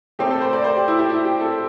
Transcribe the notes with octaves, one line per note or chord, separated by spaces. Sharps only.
C3 A3 C4 G4
A4
C5
D5
C5
G4
E4
G4
E4
G4
A4